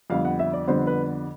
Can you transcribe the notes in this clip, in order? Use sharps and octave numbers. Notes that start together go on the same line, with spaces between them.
F2 D3 G3 B3 F5
F#5
E5
D5
F2 D3 G3 B3 C5
B4